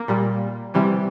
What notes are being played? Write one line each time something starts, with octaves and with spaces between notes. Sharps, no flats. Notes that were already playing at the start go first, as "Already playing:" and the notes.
Already playing: A#3
A#2 G3
C3 E3 G3